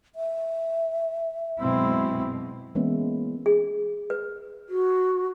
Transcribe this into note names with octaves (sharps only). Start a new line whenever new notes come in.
E5
F#2 B2 G#3 C4 E4
E3 G#3 A#3 B3 C#4 E4
G#4
B4
F#4